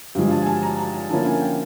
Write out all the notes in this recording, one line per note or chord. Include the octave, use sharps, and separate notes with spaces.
G2 D3 F3 G#3
A5
G#5
A5
A#5
A5
A5
D3 F3 A#3 C#4 E4 A5
G#5
G5